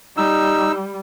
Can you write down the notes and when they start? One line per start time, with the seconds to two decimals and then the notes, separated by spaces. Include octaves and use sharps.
0.17 G3 D#4 E6